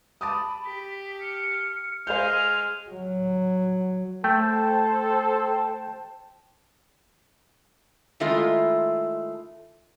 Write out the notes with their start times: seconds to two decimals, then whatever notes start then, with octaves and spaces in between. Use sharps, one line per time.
0.21 A5 B5 D6 D#6
0.65 G4 B6
1.20 F6 C#7
2.07 G#3 C5 F5 G#5 F6 G6 F7
2.90 F#3
4.24 A3 A4 C5 G5 A5
8.20 D#3 G#3 A3 E4 F4